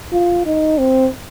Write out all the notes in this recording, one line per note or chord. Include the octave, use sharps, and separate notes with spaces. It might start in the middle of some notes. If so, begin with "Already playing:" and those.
F4
D#4
C4